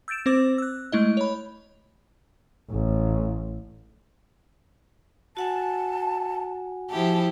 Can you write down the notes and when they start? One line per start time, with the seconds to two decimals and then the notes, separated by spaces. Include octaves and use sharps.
0.08 E6 G6 A6 D7 E7
0.26 C4 C5 D6 A6
0.58 E6 F#6
0.92 G#3 A3 E4 D#5
1.17 C#5 B5
2.71 A1
5.37 F#4 F#5 G#5 A5
6.90 F3 E4 G4 A5